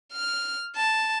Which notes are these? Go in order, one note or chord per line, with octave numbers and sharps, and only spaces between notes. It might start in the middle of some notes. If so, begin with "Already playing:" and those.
F6
A5